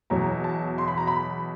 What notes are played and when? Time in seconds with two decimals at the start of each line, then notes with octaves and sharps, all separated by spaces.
0.10 E2 B2 F#3 A#5
0.44 A5
0.78 C6
0.88 B5
0.98 A#5
1.07 B5